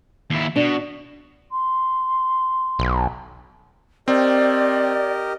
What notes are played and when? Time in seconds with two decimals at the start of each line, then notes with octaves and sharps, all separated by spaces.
0.30 D#2 E4
0.56 B2 D4
1.51 C6
2.79 B1
4.08 C4 G4 A#4 D5 D#5